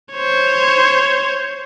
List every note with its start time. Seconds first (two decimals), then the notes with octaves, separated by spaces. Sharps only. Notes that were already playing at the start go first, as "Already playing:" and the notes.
0.13 C5 C#5